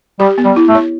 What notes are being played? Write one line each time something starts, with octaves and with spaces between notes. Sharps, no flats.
G3 G4
B3
G3
E4
A3
C#5